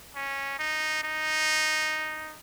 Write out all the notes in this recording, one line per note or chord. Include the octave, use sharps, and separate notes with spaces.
C#4
D#4
D#4